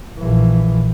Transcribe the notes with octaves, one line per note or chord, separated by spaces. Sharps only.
A#1 E3